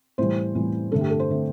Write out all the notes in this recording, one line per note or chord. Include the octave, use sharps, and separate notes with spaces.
A2 E3 G3 C5
A2 E3 G3
G2 D3 A3 A4
G4
A4
C5
D3 A3